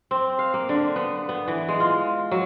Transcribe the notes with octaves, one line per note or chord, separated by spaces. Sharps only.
C4
F5
A#3
D3
B3
B3
E3
G#3
F4
F#3